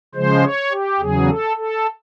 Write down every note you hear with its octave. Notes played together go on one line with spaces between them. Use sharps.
C#3 F3 G#3 C5
C#5
G4
E2 C#3 F#3 G#4
A4
A4